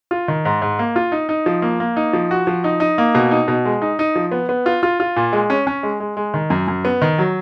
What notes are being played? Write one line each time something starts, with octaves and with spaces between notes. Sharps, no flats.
F4
D#3
G#2
G#2
A#3
F4
D#4
D#4
F3
A#3
A#3
D#4
F3
F#4
F3
D#4
D#4
A#3
B2
D#4
B2
G#3
D#4
D#4
F3
B3
B3
F4
F4
F4
A#2
G#3
C#4
C#4
G#3
G#3
G#3
D#3
F#2
F#2
B3
D#3
F#3